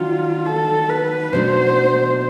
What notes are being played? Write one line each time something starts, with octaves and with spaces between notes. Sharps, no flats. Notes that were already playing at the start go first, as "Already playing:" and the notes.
Already playing: D#3 F#3 D4 F4
A4
B4
B2 F#3 A3 D4 C5